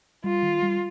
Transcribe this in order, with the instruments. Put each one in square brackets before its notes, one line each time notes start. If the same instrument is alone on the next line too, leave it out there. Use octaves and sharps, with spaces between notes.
[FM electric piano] G3 [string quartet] F4
[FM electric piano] D#3
G3